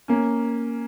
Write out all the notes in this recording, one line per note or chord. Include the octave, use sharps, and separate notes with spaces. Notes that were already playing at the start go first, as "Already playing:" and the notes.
A#3 C#4